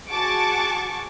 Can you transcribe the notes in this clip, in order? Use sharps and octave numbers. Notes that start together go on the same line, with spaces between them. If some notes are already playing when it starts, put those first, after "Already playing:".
F#4 G#4 F#5 A5 C#6 D6